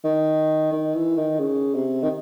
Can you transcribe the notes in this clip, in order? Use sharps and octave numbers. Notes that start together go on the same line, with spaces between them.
D#3
D#3
E3
D#3
C#3
C3
D#3